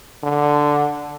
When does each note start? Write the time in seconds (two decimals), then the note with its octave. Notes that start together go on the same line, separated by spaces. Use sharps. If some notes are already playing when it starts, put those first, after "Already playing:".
0.23 D3